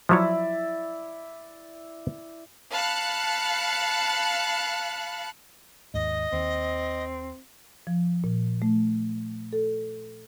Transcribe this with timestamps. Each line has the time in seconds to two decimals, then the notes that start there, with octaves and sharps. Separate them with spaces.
0.09 F3 F#3 E4 C#5 D5 E5
2.73 F5 A5 B5 F#6 C#7
5.94 D#2 G#2 D#5
6.32 D#2 D#3 C4
7.87 F3
8.24 A#2
8.62 A3
9.53 A4